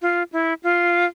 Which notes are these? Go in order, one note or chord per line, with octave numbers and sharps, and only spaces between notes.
F4
E4
F4